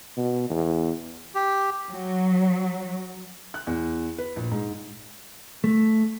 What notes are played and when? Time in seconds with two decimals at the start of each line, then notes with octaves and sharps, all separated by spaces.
0.17 B2
0.50 E2
1.35 G4
1.92 F#3
3.54 F#6
3.67 E2
4.18 B4
4.36 A#1
4.51 G#2
5.64 A3